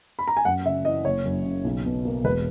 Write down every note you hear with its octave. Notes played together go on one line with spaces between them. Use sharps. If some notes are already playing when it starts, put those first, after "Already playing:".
B5
A#5
G#5
F#2 F#5
C#3 E5
E3 D#5
F#1 C#5
F#2
C#3
B1
B2
A#3
E1 B4